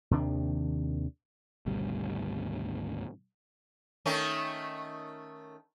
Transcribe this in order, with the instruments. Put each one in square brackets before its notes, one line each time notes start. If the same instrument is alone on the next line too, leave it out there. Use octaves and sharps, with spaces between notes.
[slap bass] D#2 C3 D#3 D4
[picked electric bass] G#1 D2 B2 G3
[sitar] D#3 A3 C#4